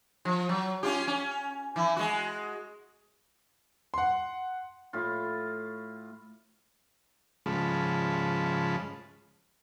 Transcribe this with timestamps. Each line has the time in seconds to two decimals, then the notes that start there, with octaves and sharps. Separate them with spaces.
0.25 F3
0.49 F#3
0.83 C#4 F4 G4
1.07 C#4
1.76 E3 E4
1.97 G#3 F#4
3.94 F#5 C6
4.93 A2 F4
7.46 G#2 C#3 F3 G#3 A5 B5